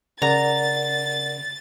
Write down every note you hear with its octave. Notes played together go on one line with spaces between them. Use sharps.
C#3 A#4 D5 F#5 A#5 A6